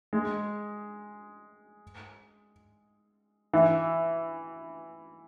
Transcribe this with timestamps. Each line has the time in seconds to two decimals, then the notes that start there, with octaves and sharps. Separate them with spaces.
0.13 G#3
3.54 E3